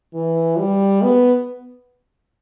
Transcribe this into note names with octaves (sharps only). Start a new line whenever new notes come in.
E3
G3
B3